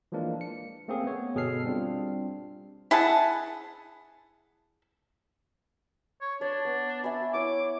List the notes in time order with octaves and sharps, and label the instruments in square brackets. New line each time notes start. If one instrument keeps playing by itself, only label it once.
[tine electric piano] E3 F3 G#3 A#3 D4
C#7
A3 A#3 C4 C#4 G#4
B3 C#5
G1 B2 G#4 A4 F6 C7
G3 C4 D4 F4
[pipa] E4 G#4 F#5 A5
[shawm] C#5
[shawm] D4 [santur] C#5
[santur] B3
E5 G#5 B5
[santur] E4 C#5 C#6 [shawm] D6